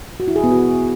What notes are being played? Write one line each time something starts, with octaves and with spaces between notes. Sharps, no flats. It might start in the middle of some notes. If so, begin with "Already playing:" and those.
F#4
E4
G#4
B3
F#4